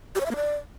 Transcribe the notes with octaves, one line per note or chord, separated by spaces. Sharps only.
G4
C#5
E5
A#3
D5